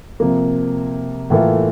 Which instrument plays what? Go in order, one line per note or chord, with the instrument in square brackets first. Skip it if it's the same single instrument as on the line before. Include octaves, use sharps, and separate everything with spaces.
[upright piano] C3 F3 A#3
A2 E3 A#3 F4 A4